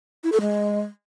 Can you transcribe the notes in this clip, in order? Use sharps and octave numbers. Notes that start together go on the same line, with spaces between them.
E4
A4
G#3